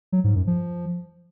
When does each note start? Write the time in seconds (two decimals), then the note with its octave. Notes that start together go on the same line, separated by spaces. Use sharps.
0.12 F#3
0.24 G#2
0.36 F#2
0.47 F3